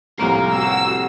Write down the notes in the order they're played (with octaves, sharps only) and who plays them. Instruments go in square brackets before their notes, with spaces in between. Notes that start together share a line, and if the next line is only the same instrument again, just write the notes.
[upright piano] C2 F2 A2 [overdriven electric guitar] A#4 F5
[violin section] F#4 E6